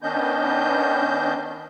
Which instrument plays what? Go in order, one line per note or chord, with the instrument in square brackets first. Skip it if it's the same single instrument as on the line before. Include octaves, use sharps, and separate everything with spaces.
[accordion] D#3 B3 C#4 D4 D#5 G6